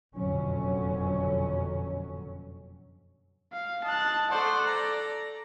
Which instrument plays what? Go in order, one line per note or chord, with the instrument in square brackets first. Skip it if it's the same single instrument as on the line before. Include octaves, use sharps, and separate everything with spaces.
[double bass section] F#1 F2 B2 D3 F#3 C#4
[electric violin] F5
[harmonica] D#5 [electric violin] A5 F#6
[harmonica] A3 C5 F#5 [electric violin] A4 D5
[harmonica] A#5